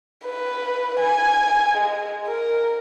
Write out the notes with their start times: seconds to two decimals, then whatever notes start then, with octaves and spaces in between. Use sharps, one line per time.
0.24 B4
1.00 G#5
1.77 G#3
2.28 A#4